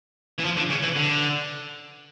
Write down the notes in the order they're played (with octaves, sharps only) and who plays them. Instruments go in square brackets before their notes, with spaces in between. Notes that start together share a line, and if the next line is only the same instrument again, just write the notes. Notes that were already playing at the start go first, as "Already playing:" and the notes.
[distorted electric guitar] E3
F3
D3
C#3
E3
D3